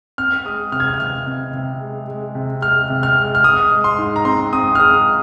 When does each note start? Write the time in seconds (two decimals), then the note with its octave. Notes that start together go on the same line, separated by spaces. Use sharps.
0.18 C4 F6
0.45 G#3 D#6
0.72 C3 F6
0.80 G#6
0.88 F6
0.99 C3 F6
1.27 C3
1.53 C3
1.81 G#3
2.08 G#3
2.35 C3
2.62 G#3 F6
2.90 C3
3.03 F6
3.16 G#3
3.35 F6
3.44 G#3 D#6
3.71 G#3
3.84 C6
3.98 G#2
4.16 A#5
4.25 C4 C6
4.53 C4 D#6
4.75 F6
4.80 G#3 D#6